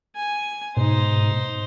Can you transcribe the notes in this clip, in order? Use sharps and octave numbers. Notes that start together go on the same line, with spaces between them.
G#5
G#2 B2 D#4 C5